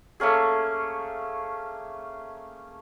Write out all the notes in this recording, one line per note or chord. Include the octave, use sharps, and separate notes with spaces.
A3 A#3 C#4 G#4